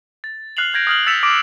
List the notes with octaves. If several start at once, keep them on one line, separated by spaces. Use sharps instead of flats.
A6
F6 F#6 C7 F7 F#7
G6 G#6 A#6 D7
D#6 F6 F#7
E6 A6 B6 C#7 E7 F7
D6 G6 A#6 D7